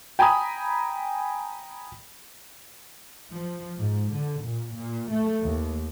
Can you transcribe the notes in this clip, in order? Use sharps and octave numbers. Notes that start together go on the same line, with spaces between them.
G5 G#5 A#5 B5 D#6
F3
G#2
D3
A#2
A#2
A3
D#2